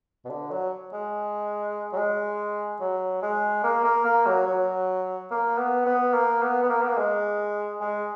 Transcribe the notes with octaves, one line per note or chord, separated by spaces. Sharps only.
B2
D3
F#3
G#3
F#3
G#3
F#3
G#3
A#3
A#3
A#3
F#3
F#3
A#3
B3
B3
A#3
B3
B3
A#3
B3
A#3
G#3
G#3